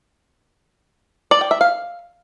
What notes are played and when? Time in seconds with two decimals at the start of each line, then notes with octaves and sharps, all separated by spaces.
1.31 D5
1.41 G5
1.51 E5
1.61 F5